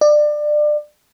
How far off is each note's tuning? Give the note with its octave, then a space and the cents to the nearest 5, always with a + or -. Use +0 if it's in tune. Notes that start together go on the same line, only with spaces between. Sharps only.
D5 +25